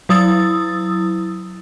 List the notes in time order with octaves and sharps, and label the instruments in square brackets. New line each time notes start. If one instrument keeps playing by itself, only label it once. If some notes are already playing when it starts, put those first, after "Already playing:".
[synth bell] F#3 E4 D#6 E6 A6